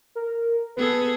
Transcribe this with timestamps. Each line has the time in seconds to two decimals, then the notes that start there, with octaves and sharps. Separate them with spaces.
0.15 A#4
0.76 B3 G#4 A4 B4